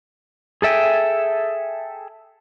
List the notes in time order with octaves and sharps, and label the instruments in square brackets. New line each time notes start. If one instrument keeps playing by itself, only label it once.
[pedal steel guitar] G#4 A4 E5 G5 G#5